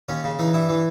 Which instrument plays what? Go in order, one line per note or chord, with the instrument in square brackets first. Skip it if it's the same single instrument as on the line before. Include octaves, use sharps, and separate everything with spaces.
[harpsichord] D#2 C#4
C#3
E3 D#4
G2 E4
E3